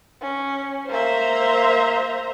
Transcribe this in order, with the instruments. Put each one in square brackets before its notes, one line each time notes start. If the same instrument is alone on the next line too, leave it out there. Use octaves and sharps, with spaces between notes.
[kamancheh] C#4
[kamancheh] A#3 E5 [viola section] C5 A#5